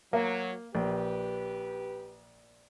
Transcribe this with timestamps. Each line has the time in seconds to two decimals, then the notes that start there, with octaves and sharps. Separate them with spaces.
0.13 F#3 A#3
0.75 A#1 G4 B4